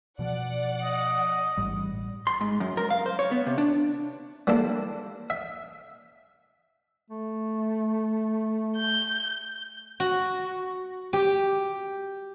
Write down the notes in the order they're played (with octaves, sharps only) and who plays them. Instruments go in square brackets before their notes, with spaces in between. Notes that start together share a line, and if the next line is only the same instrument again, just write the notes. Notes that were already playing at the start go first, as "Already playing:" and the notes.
[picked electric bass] B2 F3 [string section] D5 F#5
[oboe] D#5
[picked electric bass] A1 G#2 G3
[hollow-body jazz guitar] C6
G#2
F#2
A#4
F5
C5
C#5
B3
C3
D4
[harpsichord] G3 A#3 D4 E4 A4
E5
[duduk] A3
[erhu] G6
[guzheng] F#4
G4